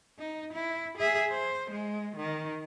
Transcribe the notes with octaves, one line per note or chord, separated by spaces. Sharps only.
D#4
E4
G#4 E5
C5
G#3
D#3